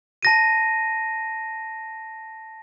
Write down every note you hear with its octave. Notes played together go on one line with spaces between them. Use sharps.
A5 A#6 D#7